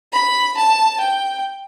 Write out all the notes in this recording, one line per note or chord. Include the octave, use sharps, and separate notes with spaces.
B5
A5
G5